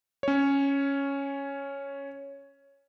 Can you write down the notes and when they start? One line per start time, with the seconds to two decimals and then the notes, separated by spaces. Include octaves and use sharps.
0.23 C#4 C#5